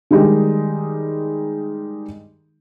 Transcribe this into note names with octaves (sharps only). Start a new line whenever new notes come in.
D#3 G3 G#3 D#4 G4